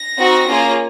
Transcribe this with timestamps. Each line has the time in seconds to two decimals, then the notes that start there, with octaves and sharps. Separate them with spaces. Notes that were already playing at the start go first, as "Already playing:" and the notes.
Already playing: A#6
0.18 C4 D#4 F#4
0.48 A#3 C#4 F4 G#4